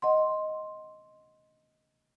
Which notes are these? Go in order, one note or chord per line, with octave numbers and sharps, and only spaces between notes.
D#5 F#5 C6